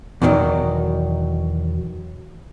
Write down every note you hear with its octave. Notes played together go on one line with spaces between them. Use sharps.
E2 B2 D#3 E3 F#3